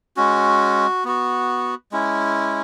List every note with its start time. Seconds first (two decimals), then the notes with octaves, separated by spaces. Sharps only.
0.17 G#3 C#4 F#4
1.05 B3 F#4
1.92 G#3 C#4 E4